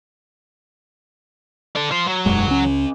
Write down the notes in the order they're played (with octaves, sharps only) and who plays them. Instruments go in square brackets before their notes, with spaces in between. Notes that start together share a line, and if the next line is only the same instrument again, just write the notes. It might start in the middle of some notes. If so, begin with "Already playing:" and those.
[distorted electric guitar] A4 D5
F4 C5
F#3
[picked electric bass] E1 F#2 G#3
C#2 C#4